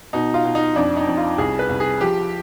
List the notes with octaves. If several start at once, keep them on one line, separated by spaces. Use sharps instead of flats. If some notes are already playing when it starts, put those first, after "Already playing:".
B2 D#4
F4
B2
D#4
F2 D4
D#4
F2
F4
C2 G#4
B4
C2
G#4
F3 G4